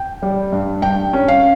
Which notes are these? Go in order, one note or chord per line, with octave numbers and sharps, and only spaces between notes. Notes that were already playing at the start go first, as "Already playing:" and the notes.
Already playing: G5
G3
G2
G2 G5
C#4
F5